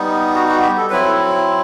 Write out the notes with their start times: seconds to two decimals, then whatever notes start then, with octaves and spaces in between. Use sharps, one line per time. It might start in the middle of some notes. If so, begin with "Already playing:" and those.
Already playing: G3 B3 D#4
0.34 F#4
0.48 F#4
0.62 G4
0.77 A4
0.90 F#3 C4 E4 B4
1.05 A4